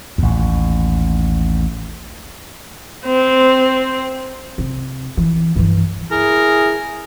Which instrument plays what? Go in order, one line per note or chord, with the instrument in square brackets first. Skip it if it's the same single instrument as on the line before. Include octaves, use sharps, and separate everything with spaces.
[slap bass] A1 D#2
[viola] C4
[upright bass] C3
E3
G2 E3
[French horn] E4 [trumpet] G#4 [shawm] A#4